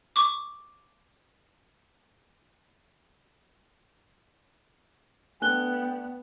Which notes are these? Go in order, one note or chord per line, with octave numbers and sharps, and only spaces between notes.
C#6 D6
A3 B3 D4 G5 G#5 F#6 G7